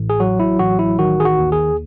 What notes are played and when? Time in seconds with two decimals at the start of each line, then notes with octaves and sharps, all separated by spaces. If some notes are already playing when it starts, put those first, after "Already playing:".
Already playing: A1 A2
0.10 G#4
0.20 F#3 F#4
0.40 E4
0.59 A1 F#4
0.79 E4
0.98 D#3 F#4
1.20 G#4
1.25 F#4
1.39 D#2
1.52 G#4